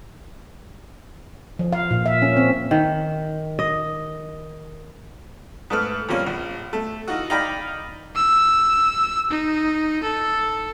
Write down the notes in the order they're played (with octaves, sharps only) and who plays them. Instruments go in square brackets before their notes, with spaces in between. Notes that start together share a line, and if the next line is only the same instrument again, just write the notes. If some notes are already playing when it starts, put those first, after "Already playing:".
[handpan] F3
F5
A#2
E5
C#4
C4
[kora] D#3
D#5
[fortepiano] G#2 A3 B4 F6
F2 A#2 G3 A#3 C#4 F4
A#1
A3
E3 D#4 F4 F#4
D#4 D5 F5 G5 A#5 B5
[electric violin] E6
D#4
A4